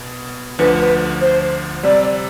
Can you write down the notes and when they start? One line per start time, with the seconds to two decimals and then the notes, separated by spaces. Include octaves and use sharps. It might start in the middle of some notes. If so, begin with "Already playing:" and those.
Already playing: B2 B3
0.59 D2 D3 F3 B4
0.80 B4
1.21 C5
1.83 C3 G3 C4 D5